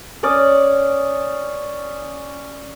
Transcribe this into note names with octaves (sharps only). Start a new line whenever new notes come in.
C#4 D5 D6 D#6